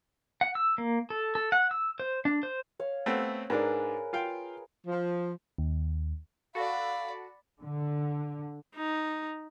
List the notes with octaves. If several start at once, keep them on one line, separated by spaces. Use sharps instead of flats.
F#5
E6
A#3
A4
A4
F#5
E6
C5
D4
C5
C#5 F5
A3 B3 C4
G#2 D4 G#4 A#4 B4
F4 F5 G5
F3
D#2
F#4 A4 D5 F5 B5
D3
D#4